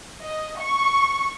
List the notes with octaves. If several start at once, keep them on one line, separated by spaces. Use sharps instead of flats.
D#5
C#6